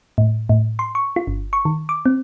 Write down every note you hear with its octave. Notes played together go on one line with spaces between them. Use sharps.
A2
A2
C6
C#6
F4
G1
C#6
D#3
D6
C4